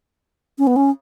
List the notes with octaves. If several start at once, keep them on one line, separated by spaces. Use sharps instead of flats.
C#4
B3
C#4